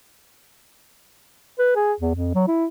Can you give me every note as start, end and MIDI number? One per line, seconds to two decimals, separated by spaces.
1.59 1.75 71
1.76 1.93 68
2.00 2.14 40
2.15 2.34 41
2.35 2.45 54
2.48 2.66 64